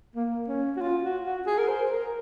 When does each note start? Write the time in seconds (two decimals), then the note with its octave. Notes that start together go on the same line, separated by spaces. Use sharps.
0.15 A#3
0.48 C#4
0.77 F#4
0.81 F4
1.03 F#4
1.25 F#4
1.47 G#4
1.58 A#4
1.68 C5
1.91 A#4